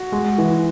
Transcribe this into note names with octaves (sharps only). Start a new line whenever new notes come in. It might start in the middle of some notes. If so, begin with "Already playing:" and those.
Already playing: F#4
G#3
E3